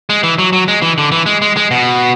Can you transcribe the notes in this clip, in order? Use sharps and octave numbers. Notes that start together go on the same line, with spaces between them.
G#3
E3
F#3
F#3
G#3
E3
D3
E3
G#3
G#3
G#3
B2